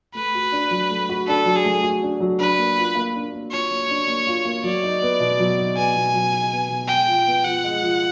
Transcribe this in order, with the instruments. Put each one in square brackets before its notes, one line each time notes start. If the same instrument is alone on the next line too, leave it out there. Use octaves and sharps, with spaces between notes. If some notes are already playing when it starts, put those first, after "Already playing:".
[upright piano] A3 [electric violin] B4
[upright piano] F#4
D4
F#3
A3
F#4
[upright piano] D4 [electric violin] A4
[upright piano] F#3
[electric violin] G#4
[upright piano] A3
F#4
D4
F#3
[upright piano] D4 [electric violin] B4
[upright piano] A#3
F4
A#3
D4
A#3
[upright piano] F4 [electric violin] C#5
[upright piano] A#3
D4
A#3
F4
A#3
[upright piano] F#3 [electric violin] D5
[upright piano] D#4
B3
B2
F#3
D#4
[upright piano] B3 [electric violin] G#5
[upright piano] B2
F#3
D#4
B3
B2
[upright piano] G#3 [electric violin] G5
[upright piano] F3
B3
[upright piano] F3 [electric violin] F#5
[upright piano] G#3
F3